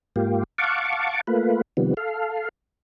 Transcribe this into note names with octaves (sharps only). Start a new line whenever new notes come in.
G#2 A#3 F4 G4
F5 F#5 A5 C#6 D6
A3 A#3 F4 B4
C3 D#3 F3 G3 B3
A4 F5